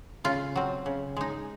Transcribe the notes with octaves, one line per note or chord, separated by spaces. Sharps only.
C#3 F4
F#3 C4
C#3
G#3 D#4